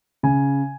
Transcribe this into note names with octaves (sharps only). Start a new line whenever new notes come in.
C#3 G#5